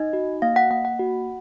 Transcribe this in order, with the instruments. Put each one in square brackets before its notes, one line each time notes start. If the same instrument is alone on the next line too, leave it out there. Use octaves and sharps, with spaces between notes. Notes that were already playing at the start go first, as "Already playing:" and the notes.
Already playing: [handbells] D#4 D#5
F#4
A#3 F5
F#5
A#3 F#5
F#5
F#4